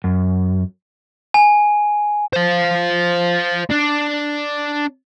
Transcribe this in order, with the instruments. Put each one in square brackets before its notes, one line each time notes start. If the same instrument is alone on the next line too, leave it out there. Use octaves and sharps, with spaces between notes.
[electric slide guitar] F#2
[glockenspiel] G#5
[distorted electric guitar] C5 F5
D4